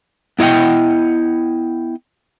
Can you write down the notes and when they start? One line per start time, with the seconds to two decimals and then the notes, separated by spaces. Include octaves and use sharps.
0.39 B3 E4 D#5 F#5 G5